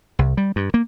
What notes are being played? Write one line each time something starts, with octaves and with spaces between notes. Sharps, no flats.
C2
G3
G2
A#3